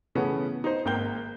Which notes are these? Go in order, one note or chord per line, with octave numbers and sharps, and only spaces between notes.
C#3 E3 A3 B3 C#4
D#4 C5
G#1 A#3 G5 G6 G7